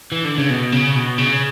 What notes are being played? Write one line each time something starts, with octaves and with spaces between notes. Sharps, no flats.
E3
D3
C#3
B2
C#3
B2
C#3